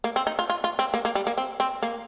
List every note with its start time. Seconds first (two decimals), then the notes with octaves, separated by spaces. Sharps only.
0.04 A#3
0.16 C4
0.27 D#4
0.39 F4
0.50 F4
0.64 F4
0.79 C4
0.94 A#3
1.05 A#3
1.15 G3
1.27 A#3
1.38 C4
1.60 C4
1.83 A#3